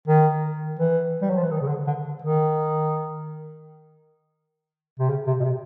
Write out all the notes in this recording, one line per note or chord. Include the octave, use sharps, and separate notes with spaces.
D#3
E3
G3
F#3
F3
E3
D#3
C#3
D3
D3
D#3
C3
C#3
C3
B2
C3